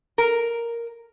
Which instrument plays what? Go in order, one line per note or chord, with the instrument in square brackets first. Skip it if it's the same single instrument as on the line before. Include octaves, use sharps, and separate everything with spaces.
[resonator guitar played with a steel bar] A#4